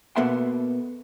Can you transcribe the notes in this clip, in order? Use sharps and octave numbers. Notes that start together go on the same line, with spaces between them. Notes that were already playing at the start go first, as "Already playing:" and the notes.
B2 A#3 B3 A4 E5 C6